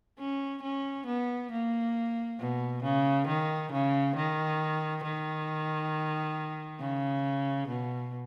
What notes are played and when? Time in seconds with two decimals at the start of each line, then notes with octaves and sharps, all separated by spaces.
0.19 C#4
0.63 C#4
1.06 B3
1.51 A#3
2.39 B2
2.84 C#3
3.28 D#3
3.72 C#3
4.16 D#3
5.03 D#3
6.80 C#3
7.69 B2